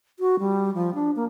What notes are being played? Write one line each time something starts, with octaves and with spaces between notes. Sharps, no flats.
F#4
G3
F3
D4
A#3